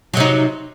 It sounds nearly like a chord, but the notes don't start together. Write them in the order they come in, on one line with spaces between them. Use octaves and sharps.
F#3 C3 D#4